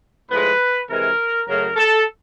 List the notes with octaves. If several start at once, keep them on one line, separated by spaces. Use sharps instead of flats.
A2 F3 G#3 B4
C3 E3 G#3 A#4
F#2 C#3 F#3 A3 A#4
A4